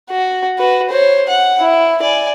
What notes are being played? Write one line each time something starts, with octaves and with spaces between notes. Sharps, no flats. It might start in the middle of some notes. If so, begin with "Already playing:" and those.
F#4
F#4 B4
C5 C#5
F#5
E4
D5 G#5